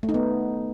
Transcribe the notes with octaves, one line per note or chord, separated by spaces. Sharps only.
A3
D#4
B3